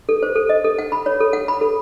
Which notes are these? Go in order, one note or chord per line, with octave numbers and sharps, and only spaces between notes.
A4
C5
A4
D#5
A4
F#5
B5
C#5
A4
F#5
B5
A4